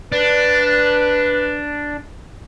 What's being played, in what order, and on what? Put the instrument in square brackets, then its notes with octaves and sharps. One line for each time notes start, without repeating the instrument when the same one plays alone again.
[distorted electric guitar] D4 [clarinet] B4